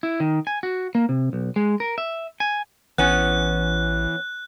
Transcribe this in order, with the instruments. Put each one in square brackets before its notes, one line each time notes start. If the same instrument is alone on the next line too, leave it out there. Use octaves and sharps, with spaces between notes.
[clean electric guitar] E4
D#3
G#5
F#4
A#3
C3
B1
G#3
A#4
E5
G#5
[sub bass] A1 [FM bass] E3 [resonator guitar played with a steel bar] B3 C#4 [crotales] F#6